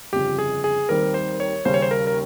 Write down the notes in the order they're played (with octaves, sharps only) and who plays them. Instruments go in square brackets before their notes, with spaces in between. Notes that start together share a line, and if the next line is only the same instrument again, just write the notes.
[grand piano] G1 F2 C#3 F3 [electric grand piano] G4
[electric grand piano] G#4
G#4
[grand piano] D#2 D#3 G3 C4 G4 [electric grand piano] A#4
[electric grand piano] C5
C#5
[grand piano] D#2 C#3 G3 C#4 [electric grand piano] C5
[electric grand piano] C#5
C5
A#4
A#4